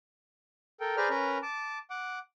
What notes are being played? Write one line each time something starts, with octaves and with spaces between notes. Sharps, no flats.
A4 A#4 G5
G#4 B4 C5 D5 A#5 F6
C#4 A#4 B4 A#5
A5 D6
F#5 D6